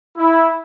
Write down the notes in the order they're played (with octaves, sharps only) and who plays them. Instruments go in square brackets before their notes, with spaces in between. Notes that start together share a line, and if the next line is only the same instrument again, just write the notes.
[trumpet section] E4